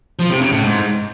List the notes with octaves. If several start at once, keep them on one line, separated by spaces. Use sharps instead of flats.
F3
C3
C#3
A2
G#2